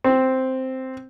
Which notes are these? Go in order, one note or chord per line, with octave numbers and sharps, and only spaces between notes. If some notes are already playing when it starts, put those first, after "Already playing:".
C4